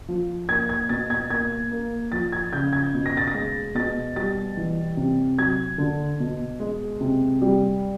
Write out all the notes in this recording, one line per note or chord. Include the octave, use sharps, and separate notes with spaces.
F3
A#3 G#6
G#6
B2 A6
G#6
A#3 G#6
A#3
F3 A6
G#6
C#3 G6
G#6
B2
A#6
A6
A#6
G#3
B2 A6
G3 A6
E3
C3
F#3 G#6
D3
B2
G#3
C3
G3